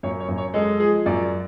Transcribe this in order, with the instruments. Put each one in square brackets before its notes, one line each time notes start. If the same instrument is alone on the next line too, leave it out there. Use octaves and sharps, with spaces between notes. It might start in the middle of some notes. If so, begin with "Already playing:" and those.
[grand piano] F#2 C#5
C#5
F#2
C#5
G#3 A4
F3 G#4
F#2 D5